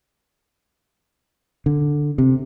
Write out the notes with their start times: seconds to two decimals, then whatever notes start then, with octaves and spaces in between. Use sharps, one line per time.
1.66 D3
2.18 C3